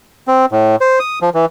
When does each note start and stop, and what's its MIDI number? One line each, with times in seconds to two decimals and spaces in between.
0.28 0.46 60
0.52 0.76 45
0.81 0.99 72
1.00 1.19 87
1.22 1.30 53
1.34 1.45 52